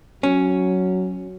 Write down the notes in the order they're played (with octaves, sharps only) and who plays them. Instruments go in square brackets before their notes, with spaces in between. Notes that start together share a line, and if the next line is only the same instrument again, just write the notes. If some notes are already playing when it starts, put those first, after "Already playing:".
[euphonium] F#3 [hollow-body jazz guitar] C#4